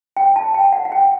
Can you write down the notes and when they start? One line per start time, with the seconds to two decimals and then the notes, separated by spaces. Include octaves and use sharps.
0.17 G5
0.36 A5
0.54 G5
0.72 F#5
0.85 F#5
0.92 G5